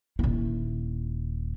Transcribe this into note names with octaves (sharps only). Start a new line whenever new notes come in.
D#1 E4